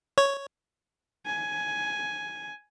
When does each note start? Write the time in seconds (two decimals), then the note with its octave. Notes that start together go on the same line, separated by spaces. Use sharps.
0.18 C#5
1.26 G#5